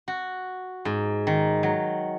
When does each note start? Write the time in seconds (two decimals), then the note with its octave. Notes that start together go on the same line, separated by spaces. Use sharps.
0.08 F#4
0.85 G#2
1.27 D#3
1.63 F#3